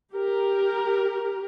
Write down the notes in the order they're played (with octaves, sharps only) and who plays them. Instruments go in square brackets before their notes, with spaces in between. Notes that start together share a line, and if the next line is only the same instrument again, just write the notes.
[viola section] G4 A#4